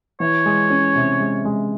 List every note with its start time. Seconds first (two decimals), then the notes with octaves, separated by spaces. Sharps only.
0.20 E3 C#5
0.46 G#3
0.70 C#4
0.95 C3
1.20 G#3
1.45 G#3